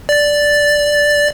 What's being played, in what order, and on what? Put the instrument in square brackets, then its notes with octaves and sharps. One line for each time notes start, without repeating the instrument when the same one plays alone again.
[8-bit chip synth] D5 A6